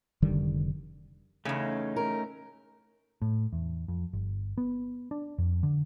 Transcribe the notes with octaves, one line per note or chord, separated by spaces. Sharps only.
F1 D3 D#3 G3
E2 C#3 A3 C#4 D#4
A#4
A2
E2
F2
G1
B3
D4
F2
D3